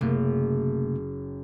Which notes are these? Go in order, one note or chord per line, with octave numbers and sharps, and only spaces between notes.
F#1 C3 A3 A#3